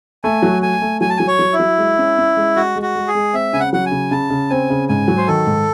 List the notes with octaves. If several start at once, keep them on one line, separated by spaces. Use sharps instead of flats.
A3 G#5
F#3
A3 G#5
A3
F#3 G#5
A5
F#3 G#5
C#5
F#3
E4
F#3
G#3
C#4
C#4
G#3
G#3 F#4
G#3
F#4
G#3
G#4
G#3
C4 E5
C#3 G#5
F#5
F#3 F#5
G#5
C#3
C#3 A5
C#3
C4 G#5
C#3
G#2 G#5
F#3
C5
D#3 A4
G#2